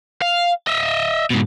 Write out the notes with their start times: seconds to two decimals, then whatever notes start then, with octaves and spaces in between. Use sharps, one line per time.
0.22 F5
0.67 D#5 E5
1.30 G#2 B2